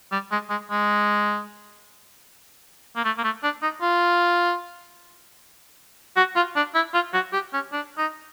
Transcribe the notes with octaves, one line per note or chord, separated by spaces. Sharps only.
G3
G#3
G#3
G#3
A#3
A3
A#3
A3
D4
D#4
F4
F#4
F4
D4
E4
F4
F#4
G4
C#4
D4
D#4